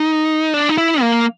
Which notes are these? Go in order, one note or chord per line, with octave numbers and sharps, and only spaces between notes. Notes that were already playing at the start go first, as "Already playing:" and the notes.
Already playing: D#4
D4
D#4
E4
A#3